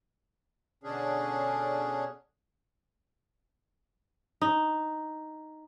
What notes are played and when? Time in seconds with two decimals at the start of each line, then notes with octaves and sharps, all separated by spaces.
0.84 B2 D3 C#4 D4 G#4
4.42 D#4